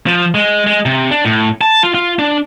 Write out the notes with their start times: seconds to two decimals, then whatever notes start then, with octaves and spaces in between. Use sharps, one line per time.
0.07 F3
0.35 G#3
0.66 G#3
0.86 C3
1.11 D4
1.25 A2
1.61 A5
1.83 F4
1.95 F4
2.19 D4